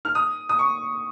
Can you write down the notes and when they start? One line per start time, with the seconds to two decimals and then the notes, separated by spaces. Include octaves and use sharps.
0.05 F6
0.15 D#6
0.49 D#6
0.59 C#6